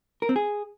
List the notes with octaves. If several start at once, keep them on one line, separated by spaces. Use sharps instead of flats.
A#4
C4
G#4